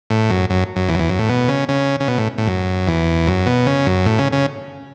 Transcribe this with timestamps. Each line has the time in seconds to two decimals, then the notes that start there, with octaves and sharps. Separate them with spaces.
0.10 A2
0.30 F#2
0.50 F#2
0.76 F#2
0.89 E2
0.95 F#2
0.99 E2
1.09 F#2
1.19 A2
1.29 B2
1.48 C#3
1.69 C#3
2.00 C#3
2.08 B2
2.18 A2
2.38 A2
2.47 F#2
2.87 E2
3.27 F#2
3.46 B2
3.67 C#3
3.86 F#2
4.06 A2
4.19 C#3
4.32 C#3